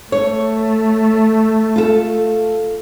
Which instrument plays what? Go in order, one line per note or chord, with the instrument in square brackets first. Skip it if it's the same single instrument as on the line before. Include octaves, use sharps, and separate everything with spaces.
[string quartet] A3 [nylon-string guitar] C#5
[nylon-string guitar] F4 A4